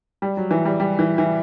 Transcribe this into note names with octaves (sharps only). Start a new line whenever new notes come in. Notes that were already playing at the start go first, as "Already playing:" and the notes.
G3
F#3
E3
G3
G3
E3
E3